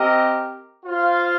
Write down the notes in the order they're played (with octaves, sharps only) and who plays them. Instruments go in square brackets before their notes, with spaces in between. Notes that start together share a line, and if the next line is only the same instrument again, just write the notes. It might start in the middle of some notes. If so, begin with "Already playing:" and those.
Already playing: [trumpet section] C4 G4 A#4 D#5
F4 C5 F5